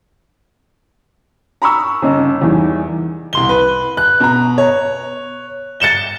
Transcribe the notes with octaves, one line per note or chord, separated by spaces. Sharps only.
A#5 B5 C#6 E6
G1 C#3 D#5
E2 D#3 E3 G3
C2 C6 G7
B4
F#6
B2 A#5
C#5
A6 C#7 E7 G7